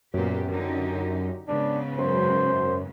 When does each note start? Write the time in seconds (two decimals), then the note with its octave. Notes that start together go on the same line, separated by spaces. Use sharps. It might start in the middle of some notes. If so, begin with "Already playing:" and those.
0.14 F#2 A#2 B3 G4
0.50 D3 D#4 G4
1.48 G#2 C#3 B3 D4
1.99 F#2 C5